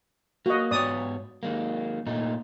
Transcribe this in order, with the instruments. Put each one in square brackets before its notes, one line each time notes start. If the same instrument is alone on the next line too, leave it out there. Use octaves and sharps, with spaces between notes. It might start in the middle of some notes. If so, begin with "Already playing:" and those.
[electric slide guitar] A#3 [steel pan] F#4 D#5
[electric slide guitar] G#2 B3 C#5 [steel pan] D5 D#6
[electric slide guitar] D#3 G#3 A#3
A#2 A3 D#4